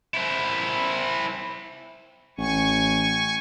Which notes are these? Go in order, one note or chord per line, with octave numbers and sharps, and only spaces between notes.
E4 C5
A1 G#5 C#6